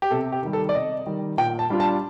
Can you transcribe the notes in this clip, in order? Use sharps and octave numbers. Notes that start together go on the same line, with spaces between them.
G4
C3 A4
G4
D#3 G3
A4
D5
C3 D#5
D#3 G3
A#2 G5
A5
G3 D4 F4
A5